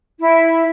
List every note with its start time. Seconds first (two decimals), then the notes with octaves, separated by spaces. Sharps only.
0.20 E4